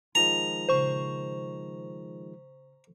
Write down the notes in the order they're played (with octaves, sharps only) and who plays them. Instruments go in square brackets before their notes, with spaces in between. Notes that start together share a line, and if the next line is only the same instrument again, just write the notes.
[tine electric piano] D#3 F3 G#3 [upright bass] F4 [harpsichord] A#5
[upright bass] A#2 C#3 [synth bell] C5 C#6